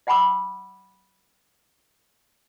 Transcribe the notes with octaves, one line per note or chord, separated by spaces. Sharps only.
D#5 F#5 G#5 B5 D6 E6